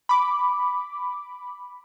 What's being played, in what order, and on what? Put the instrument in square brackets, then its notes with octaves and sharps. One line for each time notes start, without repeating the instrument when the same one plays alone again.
[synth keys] B5 D6